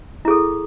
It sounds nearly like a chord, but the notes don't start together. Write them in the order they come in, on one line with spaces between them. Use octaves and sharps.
E4 G#4 A4